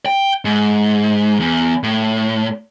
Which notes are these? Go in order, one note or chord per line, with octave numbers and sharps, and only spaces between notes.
G5
G#2
E2
A2